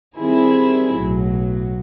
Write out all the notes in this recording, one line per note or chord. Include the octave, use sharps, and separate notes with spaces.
D#3 G3 C4 E4 G#4
B1 A2 F#3